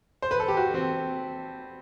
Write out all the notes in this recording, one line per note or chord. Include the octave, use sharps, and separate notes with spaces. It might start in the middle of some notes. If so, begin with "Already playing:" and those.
C5
B4
A4
G4
F#4
C4